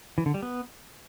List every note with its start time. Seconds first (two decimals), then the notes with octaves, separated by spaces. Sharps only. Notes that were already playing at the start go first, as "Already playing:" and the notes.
0.18 E3
0.26 D3
0.34 G3
0.43 B3